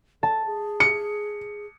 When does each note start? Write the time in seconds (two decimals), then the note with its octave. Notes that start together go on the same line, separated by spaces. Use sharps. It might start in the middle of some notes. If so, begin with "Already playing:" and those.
0.23 A4 A5
0.46 G#4
0.80 C#7